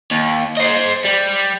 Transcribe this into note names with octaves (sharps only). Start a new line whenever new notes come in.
D#2
C5 D#5
G3